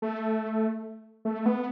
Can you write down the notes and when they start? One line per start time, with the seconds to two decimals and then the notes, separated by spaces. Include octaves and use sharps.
0.02 A3
1.25 A3
1.46 B3